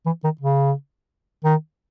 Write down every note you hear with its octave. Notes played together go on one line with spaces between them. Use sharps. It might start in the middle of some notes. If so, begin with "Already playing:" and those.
E3
D#3
C#3
D#3